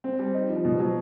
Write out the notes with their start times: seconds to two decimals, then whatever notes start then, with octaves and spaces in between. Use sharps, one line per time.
0.04 C4
0.19 G3
0.34 D#4
0.49 F3
0.65 B2
0.80 F#3